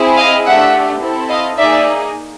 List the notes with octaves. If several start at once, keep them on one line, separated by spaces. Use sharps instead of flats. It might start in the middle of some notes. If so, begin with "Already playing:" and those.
Already playing: C4 E4 G#4
D#5 F5
A3 D4 G4 E5 F#5
C4 E4 A4
D#5 F5
A#3 D#4 G#4 D5 E5